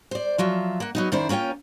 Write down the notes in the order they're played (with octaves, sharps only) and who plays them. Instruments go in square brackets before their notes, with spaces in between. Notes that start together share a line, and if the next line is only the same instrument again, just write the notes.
[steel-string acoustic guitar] C5 D5
F3 F#3 F4 E5
A#3 F#5
F#3 B3 D#4
F#2 D#3 E4 C5 D5
A#3 C#4 F4 C#5 G5